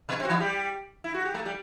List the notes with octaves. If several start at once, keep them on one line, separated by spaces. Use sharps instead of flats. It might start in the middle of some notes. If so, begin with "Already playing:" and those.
B2 B3
C3 C4
F#4
E3 E4
G3 G4
E4
F#4
G4
A3 A4
G3 G4